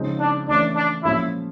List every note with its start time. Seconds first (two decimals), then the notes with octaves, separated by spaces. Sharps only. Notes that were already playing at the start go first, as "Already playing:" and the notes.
Already playing: C#3 F3 G#3 C4 D#4
0.20 D4
0.48 E3 A3 C#4 D4
0.76 D4
1.04 A#2 F3 G#3 C#4 E4